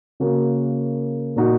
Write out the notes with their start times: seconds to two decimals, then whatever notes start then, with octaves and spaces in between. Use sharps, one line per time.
0.20 C#3 A#3 F#4 A#4
1.36 A#2 A#3 D#4 F#4 A#4